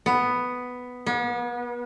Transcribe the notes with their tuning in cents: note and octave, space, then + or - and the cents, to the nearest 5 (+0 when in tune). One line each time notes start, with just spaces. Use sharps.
B3 +5
B3 -40